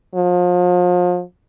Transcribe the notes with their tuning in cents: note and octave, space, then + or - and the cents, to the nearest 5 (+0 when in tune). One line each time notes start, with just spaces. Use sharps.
F3 +35